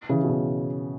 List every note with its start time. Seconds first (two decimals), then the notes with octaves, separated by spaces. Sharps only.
0.09 C#3 E3
0.24 B2
0.29 C#3